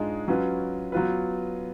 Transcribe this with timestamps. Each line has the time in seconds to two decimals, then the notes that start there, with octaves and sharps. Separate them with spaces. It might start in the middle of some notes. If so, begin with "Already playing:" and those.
Already playing: G#2 G#3 D4 F4 G#4
0.28 F#3 C#4 F4 B4
0.92 F#3 B3 F4 B4